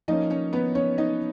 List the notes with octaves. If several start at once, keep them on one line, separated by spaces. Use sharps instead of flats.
F3 A#3 C#4 D#4 D#5
C#4 C#5
B3 B4
C#4 C#5
D#4 D#5